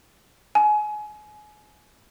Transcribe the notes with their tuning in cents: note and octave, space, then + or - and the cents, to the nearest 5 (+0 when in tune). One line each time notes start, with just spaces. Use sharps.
G#5 +25